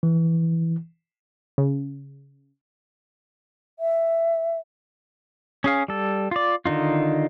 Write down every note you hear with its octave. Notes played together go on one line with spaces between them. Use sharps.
E3
C#3
E5
C#4 G#4 F5
G3 A4
F4 D5
D3 D#3 D#4 F4